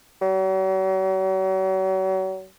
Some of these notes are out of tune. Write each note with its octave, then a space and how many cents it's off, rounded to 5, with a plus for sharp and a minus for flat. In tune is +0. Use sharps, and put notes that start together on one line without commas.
F#3 +40